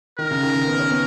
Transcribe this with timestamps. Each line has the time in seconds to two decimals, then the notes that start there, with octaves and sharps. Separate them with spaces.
0.18 D#3 A#4
0.31 C#3
0.43 D#3
0.55 D#3
0.67 B3
0.79 C#4
0.91 B3